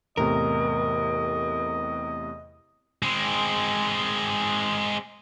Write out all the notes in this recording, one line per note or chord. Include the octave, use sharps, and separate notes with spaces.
E2 A2 C3 A#4 D#5
G#3 C4